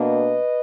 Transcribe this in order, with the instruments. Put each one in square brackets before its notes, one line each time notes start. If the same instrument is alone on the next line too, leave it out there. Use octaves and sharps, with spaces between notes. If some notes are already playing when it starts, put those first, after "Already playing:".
Already playing: [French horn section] B2 A#3 D4 B4 D#5